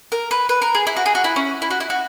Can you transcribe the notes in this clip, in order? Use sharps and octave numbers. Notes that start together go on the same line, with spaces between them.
A#4
B4
B4
A#4
G#4
E4
F#4
G#4
F#4
E4
C#4
E4
F#4
E4
F#4